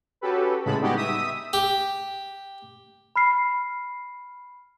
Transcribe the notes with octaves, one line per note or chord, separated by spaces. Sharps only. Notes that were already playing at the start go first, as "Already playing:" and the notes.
C#4 F#4 G4 A4 B4
A2 C#3 G#3 A5 B5
G3 G#3 B3 D#4 F#4 G4
E5 D#6 B6
G4
B5 F6 C7